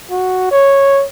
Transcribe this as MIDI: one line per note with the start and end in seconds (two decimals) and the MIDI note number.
0.10 0.49 66
0.51 1.04 73